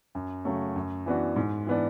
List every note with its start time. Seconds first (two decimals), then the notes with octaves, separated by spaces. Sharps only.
0.15 F#2
0.45 C#3 F#3 A3
0.76 F#2
1.06 E3 B3 D4 F#4
1.36 G#2
1.67 E3 B3 D4